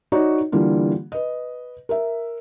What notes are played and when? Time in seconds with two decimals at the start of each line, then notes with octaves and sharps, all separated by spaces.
0.12 D#4 F#4 C#5 D5
0.52 D3 E3 G3 A#3 F4
1.12 B4 D#5
1.89 A#4 E5